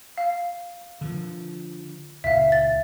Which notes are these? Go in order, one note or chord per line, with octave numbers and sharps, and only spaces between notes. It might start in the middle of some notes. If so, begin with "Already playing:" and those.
F5
D3 F3
C#2 A#2 E5 F5
A6